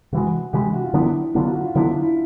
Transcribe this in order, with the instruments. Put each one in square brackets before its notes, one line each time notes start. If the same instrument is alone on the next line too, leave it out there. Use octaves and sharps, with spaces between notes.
[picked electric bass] C3 E3 G#3 [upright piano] F#4
[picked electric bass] C3 E3 G#3 [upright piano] G4
[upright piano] F#4
F4
[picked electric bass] D3 F#3 B3 D4 [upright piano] E4
[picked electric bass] D3 F#3 B3 D4 [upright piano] F4
[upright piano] F#4
F#4
F4
[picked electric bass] D3 F#3 B3 D4 [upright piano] E4
[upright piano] F4
E4